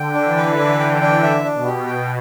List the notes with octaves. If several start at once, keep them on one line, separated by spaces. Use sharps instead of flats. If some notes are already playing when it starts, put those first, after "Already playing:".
Already playing: D3 G5
D4
E3
B4
D3 D4
G5
D4
D3 E5
D4
B2
G4
B2 G5